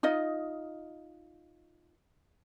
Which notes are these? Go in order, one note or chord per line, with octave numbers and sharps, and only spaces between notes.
D#4 F4 D#5